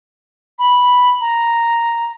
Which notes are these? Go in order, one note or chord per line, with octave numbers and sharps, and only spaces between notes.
B5
A#5